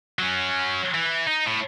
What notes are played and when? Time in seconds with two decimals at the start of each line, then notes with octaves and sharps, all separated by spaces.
0.19 F#3 C#4
0.94 E3
1.27 D#4
1.47 A2